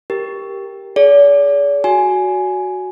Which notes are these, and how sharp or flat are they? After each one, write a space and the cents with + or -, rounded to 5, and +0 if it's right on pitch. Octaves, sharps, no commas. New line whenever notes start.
G4 +0 A#4 +0
G#4 +15 D5 -45
F#4 +0 G#5 +10